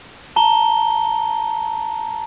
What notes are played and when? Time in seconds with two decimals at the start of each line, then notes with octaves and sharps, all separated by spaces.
0.36 A5 A#5 G7